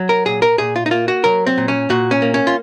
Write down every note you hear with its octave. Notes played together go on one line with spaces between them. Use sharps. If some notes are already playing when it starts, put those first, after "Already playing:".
Already playing: F#3
A#4
A#2 G#4
A#4
A#2 G#4
F4
D#4
A#3 F4
F#4
F#3 A#4
C4
A#2
C#4
A#2 F#4
C#4
A#3
C#4
F4